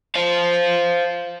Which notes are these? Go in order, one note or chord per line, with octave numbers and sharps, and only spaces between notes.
C5 F5